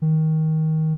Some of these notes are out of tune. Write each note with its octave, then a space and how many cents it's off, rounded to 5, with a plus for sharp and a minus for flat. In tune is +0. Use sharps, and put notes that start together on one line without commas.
D#3 +20